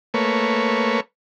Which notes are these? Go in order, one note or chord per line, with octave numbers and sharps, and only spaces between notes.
A3 A#3 B4 C#5